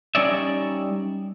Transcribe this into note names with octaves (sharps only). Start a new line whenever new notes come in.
G3 C#4 D#4 C#5 D5 E5